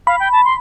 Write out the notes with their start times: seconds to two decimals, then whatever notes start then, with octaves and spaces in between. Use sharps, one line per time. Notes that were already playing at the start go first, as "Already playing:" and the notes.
0.07 F5 B5
0.20 G5
0.32 A5
0.45 C6